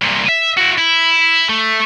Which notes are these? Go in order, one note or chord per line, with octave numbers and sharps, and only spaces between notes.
C2 A#2
E5
E4 F#4
E4
A3